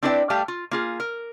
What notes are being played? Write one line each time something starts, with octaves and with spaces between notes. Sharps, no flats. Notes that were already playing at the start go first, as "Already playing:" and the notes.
C4 D4 E4 B4 D5 G5
G3 A3 G4 F5 G5
F4
A#3 F4 G#4
A#4